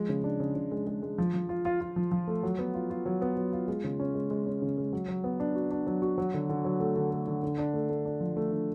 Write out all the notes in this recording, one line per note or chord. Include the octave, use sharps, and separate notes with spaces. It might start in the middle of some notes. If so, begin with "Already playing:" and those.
Already playing: F3 G#3
C#3
D4
C#3
C#3
G#3
G#3
G#3
F3
F3
F4
F4
F4
F3
F3
A3
F#3
B3
F4
F4
F#3
B3
F#3
F4
G#3
C#3
C#4
G#3
G#3
C#4
C#3
G#3
F#3
F#3
B3
D4
F#4
D4
F#3
F#4
F#3
D3
D3
F#3
A3
D3
A3
D3
D3
D4
A3
A3
D4
F3
A3
D3